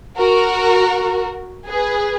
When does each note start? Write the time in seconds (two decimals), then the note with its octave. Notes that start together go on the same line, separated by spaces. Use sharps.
0.17 F#4 A#4
1.67 G#4 B4